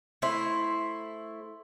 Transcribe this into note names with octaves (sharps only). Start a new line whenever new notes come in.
A3 E4 C5